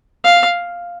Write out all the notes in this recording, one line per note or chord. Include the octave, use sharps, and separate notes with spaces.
F5